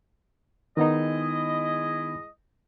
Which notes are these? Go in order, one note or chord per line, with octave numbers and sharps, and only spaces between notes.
D#3 G#3 B3 D#4 E4 D#5